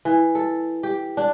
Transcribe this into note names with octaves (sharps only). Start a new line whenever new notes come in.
E3
A4
G4
D4